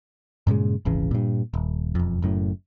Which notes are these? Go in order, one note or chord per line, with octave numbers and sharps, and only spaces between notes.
G2 A#2 C#3 G#3
D#1 G#1 C#3 E3
G2 A#2
D#1
E1 F2
F#1 F#2 A2